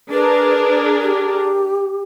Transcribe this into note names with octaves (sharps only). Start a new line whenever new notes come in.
D4 G#4 A#4 B4
G4